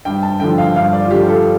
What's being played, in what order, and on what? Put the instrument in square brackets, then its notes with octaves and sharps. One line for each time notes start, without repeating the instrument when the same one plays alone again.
[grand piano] G2 [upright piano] G5
[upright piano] A5
[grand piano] D3 F3 [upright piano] G5
[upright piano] F5
[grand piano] G2 [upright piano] F5
[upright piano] D5
F4
[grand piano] D3 F3 [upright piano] G4
[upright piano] A4